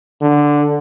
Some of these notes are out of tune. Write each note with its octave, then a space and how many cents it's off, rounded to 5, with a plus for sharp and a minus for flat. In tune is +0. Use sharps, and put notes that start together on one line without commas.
D3 +0